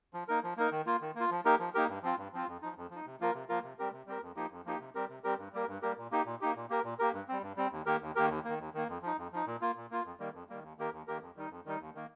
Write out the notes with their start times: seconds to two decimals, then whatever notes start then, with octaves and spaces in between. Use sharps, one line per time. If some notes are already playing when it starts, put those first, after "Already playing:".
0.14 F3
0.28 A#3 D#4 A#4
0.44 F3
0.57 A#3 D#4 A#4
0.72 D#3
0.86 A#3 F4
1.01 D#3
1.15 A#3 F4
1.31 F3
1.45 A#3 D#4 G4 A#4
1.59 F3
1.74 A#3 D#4 G4 A#4
1.89 G2
2.03 F3 C4 F4
2.18 G2
2.33 F3 C4 F4
2.47 F2
2.62 F3 D#4
2.77 F2
2.91 F3 D#4
3.06 C3
3.20 F3 A#3 F4 A#4
3.34 C3
3.49 F3 A#3 F4 A#4
3.63 C3
3.79 G3 C4 G4 A#4
3.92 C3
4.07 G3 C4 G4 A#4
4.22 F2
4.36 F3 A#3 D#4 G4
4.51 F2
4.65 F3 A#3 D#4 G4
4.80 C3
4.95 G3 C4 G4 A#4
5.09 C3
5.24 G3 C4 G4 A#4
5.38 G2
5.53 G3 A#3 G4 A#4
5.68 G2
5.82 G3 A#3 G4 A#4
5.97 A#2
6.11 A#3 D#4 G4
6.25 A#2
6.41 A#3 D#4 G4
6.56 A#2
6.70 A#3 G4 A#4
6.84 A#2
6.99 A#3 G4 A#4
7.13 G2
7.28 G3 C4
7.43 G2
7.57 G3 C4
7.72 D#2
7.86 D#3 A#3 G4 A#4
8.01 D#2
8.16 D#3 A#3 G4 A#4
8.30 D#2
8.44 D#3 A#3
8.59 D#2
8.74 D#3 A#3
8.88 F2
9.02 F3 D#4
9.18 F2
9.32 F3 D#4
9.46 A#2
9.61 A#3 F4
9.76 A#2
9.91 A#3 F4
10.05 F2
10.20 D#3 G3 A#3
10.34 F2
10.49 D#3 G3 A#3
10.63 D#2
10.78 D#3 A#3 G4 A#4
10.92 D#2
11.07 D#3 A#3 G4 A#4
11.21 F2
11.36 D#3 G3 D#4
11.51 F2
11.66 D#3 G3 D#4
11.80 D#2
11.95 D#3 A#3